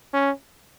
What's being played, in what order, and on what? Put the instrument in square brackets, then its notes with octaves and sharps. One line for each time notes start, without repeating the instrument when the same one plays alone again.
[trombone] C#4